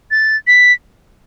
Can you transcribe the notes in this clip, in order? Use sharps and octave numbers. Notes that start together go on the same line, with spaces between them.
A6
B6